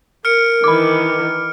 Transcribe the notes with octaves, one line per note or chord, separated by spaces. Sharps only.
A#4 F6 C#7 D7
D#3 E3 B5 D6